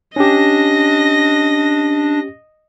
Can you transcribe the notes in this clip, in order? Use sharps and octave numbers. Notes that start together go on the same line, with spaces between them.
C#4 D4 G4 D#5 A#6